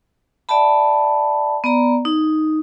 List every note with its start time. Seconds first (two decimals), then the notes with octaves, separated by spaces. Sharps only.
0.49 D5 E5 G5 A5 B5
1.64 B3 D5 A#5
2.05 D#4